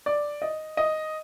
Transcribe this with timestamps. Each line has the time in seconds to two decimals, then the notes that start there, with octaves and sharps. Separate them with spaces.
0.06 D5
0.42 D#5
0.77 D#5